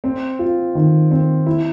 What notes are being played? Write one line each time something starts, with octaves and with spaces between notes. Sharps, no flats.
C4
F4
D#3
C4
E4